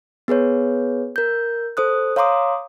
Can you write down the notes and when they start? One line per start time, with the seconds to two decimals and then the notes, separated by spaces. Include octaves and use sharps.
0.28 B3 G#4 B4 C#5
1.16 A#4 G6
1.77 A4 C5 D#6 F#6
2.16 C#5 F5 A#5 C6 D6 D#6